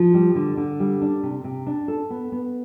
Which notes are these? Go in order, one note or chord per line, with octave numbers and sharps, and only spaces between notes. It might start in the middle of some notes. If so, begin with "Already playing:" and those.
Already playing: F3
G3
D3
D3
G3
D4
C3
C3
D4
A4
B3
B3